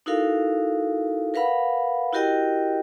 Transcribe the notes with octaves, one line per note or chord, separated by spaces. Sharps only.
D#4 E4 F#4 A4 A#4 F5
A#4 B4 F5 F#5 B5
E4 F#4 G4 A#4 D#5 G5